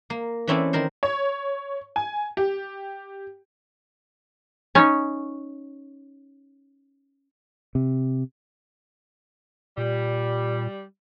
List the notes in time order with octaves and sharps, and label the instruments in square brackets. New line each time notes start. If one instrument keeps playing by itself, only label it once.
[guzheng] A#3
E3 C4 C#4 E4 A4 D5
D#3 A#4 C5
[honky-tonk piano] C#5
G#5
G4
[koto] C#4 D#4 C#5
[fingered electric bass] C3
[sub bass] A#2 [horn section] G3